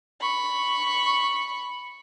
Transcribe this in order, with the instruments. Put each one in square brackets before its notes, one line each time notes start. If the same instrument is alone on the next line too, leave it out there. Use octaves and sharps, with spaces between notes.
[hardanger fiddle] B5 C#6